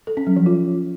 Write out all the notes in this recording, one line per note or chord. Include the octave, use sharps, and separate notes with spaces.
A4
C#4
F#3
F3
F4